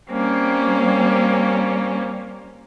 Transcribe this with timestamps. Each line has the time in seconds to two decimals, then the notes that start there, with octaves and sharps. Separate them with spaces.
0.11 G3 A#3 C4 C#4